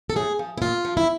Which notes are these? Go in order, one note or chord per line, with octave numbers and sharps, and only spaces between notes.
A4
A2 G#4
F3
E4
A#2 F4
F3
E4